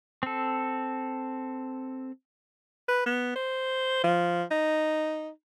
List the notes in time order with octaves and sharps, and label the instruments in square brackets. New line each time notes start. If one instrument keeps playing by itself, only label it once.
[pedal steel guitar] C4 A4
[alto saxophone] B4
B3
C5
F3
D#4